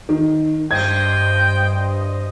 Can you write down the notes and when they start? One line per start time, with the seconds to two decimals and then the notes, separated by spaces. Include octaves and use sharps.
0.09 D#3
0.71 G2 C5 D#5 G5 G#6